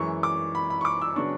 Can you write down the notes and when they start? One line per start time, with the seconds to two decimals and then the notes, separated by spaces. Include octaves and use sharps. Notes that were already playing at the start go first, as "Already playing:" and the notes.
Already playing: F#2 E3 G#3 C#6
0.23 D6
0.55 B5
0.70 B5
0.81 C#6
0.85 D6
1.02 E6
1.16 C#3 F#3 B3 D4 C#6